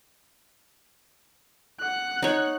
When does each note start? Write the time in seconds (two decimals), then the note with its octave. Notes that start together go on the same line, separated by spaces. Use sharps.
1.80 F#5 F#6
2.22 D#4 C#5